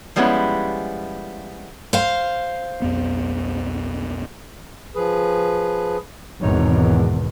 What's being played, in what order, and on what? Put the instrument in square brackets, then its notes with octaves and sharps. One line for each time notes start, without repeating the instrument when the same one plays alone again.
[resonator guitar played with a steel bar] F3 G3 G#3 B3 C#4 E4
[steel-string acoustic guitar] C5 F5
[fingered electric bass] B1 F2 B3
[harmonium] F3 G#4 B4
[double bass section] G#1 E2 B2 [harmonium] D#4 C#5